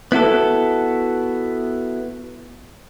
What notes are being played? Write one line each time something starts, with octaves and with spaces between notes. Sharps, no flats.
B3 E4 F#4 A4